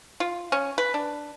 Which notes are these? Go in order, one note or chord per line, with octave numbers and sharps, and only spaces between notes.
F4
C#4
B4
D4